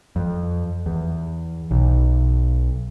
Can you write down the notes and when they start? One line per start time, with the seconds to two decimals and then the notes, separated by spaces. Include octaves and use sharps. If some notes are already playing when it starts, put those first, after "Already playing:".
0.16 F2
0.86 E2
1.71 B1